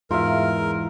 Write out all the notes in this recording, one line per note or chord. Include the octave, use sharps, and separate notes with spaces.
E2 G#2 F4 A#4 E5